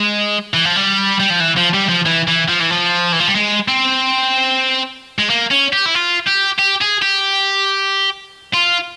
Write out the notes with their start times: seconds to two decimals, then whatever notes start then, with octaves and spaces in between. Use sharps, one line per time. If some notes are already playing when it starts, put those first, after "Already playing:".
Already playing: G#3
0.54 E3
0.65 F3
0.76 G3
1.20 G3
1.30 F3
1.40 E3
1.57 F3
1.74 G3
1.89 F3
2.06 E3
2.28 E3
2.48 F3
2.60 E3
2.70 F3
3.12 E3
3.19 F3
3.28 G3
3.35 G#3
3.68 C4
5.19 G#3
5.30 A#3
5.51 C#4
5.73 G4
5.86 E4
5.95 F4
6.27 G4
6.59 G4
6.82 G#4
7.02 G4
8.54 F4